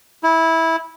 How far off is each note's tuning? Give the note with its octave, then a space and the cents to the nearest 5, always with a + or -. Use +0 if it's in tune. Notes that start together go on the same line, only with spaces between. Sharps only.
E4 -15